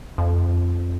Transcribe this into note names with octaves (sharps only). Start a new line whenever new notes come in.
F2